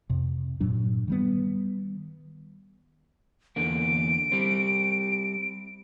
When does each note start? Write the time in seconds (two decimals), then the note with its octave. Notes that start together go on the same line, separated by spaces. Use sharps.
0.10 F2 C3
0.60 G2 A#2 F#3 D4
1.08 D#3 G3 B3
3.56 E2 D3 A#3 D7
4.32 G3 C4